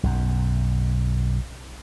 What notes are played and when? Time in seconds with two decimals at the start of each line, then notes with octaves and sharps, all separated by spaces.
0.03 B1 F#2